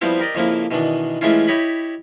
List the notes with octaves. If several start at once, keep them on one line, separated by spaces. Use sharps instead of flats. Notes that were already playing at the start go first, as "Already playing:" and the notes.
F3 G3 B3 C4 E4
G4 A#4 D5 D#5
F2 C#3 F3 A#3 E4
B2 D#3 E3 D4
E3 G#3 A3 C#4 E4 F4
E4 G4 C#5 D#5 B5